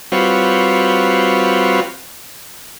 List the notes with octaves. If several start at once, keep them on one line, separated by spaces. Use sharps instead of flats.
G3 C4 F4 F#4 B4 C#5